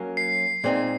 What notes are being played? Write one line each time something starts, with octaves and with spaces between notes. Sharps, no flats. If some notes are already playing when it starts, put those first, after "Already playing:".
Already playing: F#3 A#3 C#4
C7
A#2 G#3 C4 D#4